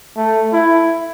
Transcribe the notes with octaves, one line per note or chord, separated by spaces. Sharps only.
A3
E4